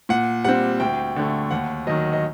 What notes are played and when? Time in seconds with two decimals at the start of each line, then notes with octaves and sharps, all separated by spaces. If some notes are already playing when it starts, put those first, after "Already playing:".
0.09 A#2 F#5
0.44 G3 C4 F#5
0.80 D2 G5
1.16 D3 A3
1.50 D#2 F#5
1.87 D#3 F#3 D#5
2.13 D#5